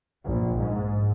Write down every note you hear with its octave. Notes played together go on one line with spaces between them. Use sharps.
A#1
G#2